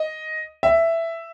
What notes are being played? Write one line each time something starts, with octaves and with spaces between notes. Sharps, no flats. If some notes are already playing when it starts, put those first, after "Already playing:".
Already playing: D#5
E5